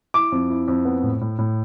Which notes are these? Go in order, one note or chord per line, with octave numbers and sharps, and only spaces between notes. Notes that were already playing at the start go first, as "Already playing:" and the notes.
E4 D6
F2
E4
F2
B3
A2
A2
A2